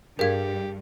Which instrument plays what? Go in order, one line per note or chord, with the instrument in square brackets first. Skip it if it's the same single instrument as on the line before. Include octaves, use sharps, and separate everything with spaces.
[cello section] G2 [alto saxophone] G4 [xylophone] G#4 F5 [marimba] A#4 G#6